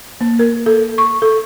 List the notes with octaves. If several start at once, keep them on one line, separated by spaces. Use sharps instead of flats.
A#3
A#4
A4
C#6
A4